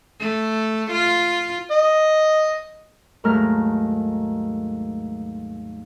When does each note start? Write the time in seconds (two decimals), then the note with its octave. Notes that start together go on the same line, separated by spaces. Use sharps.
0.20 A3
0.91 F4
1.71 D#5
3.24 D#2 G#2 F#3 A3 A#4 F6